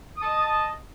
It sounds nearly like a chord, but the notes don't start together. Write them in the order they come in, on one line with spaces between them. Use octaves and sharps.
D#6 A5 D#5